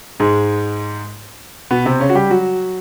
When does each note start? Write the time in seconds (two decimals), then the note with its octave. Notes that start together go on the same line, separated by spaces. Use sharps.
0.20 G#2 G#3
1.71 B2 B3
1.86 C3 C4
2.00 C#3 C#4
2.09 F#4
2.15 G3 G4
2.30 F#3 F#4